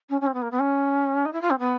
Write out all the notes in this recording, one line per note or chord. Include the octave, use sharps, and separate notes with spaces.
C#4
C#4
C4
B3
A#3
B3
C#4
D#4
E4
F4
C4
B3